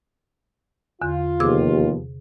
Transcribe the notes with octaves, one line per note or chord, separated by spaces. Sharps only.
E2 D3 F4
D#2 C3 F3 B3 G4 G#4 D6